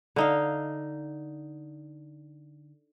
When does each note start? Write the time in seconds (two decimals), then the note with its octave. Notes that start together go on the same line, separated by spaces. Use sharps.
0.16 D3 D#4 F5